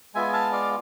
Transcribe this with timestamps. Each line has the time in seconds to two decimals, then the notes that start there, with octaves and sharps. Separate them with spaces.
0.14 G#3 B3 F4 E5 G#5
0.33 F5 A5
0.52 D5 F5